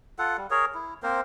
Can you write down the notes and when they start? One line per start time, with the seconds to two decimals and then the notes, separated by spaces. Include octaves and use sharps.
0.19 F4 A4 F#5
0.38 G3
0.51 G#4 A#4 C#5
0.75 E4
1.03 A#3 C4 A#4 C5